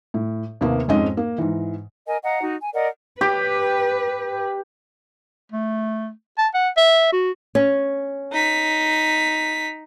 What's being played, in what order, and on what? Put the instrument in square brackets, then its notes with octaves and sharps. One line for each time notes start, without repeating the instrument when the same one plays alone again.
[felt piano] A2
D#2 C3 A#3 B3
F2 G#2 G#3 C4 C#4 D#5
A#3
G#2 E3
[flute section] A#4 D#5 G#5
D#5 F5 F#5 A#5
D#4 F#4
G#5
A#4 D5 D#5 F#5
[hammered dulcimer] G4 [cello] B4
[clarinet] A3
A5
F#5
E5
F#4
[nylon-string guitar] C#4
[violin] D#4 B6